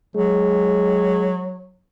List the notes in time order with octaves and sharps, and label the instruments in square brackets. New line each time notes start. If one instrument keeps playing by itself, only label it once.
[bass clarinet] F#3 [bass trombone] G#3